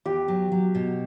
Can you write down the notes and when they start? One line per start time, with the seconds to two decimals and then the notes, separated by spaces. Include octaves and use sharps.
0.05 E2 G4
0.28 F#3
0.52 F#3
0.75 B2